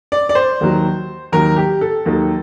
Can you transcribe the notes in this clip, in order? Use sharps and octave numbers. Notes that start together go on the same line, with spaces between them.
D5
D5
C5
D#2 D#3 F#3
D#2 D#3 F#3 A#4
G4
A4
D#2 D#3 F#3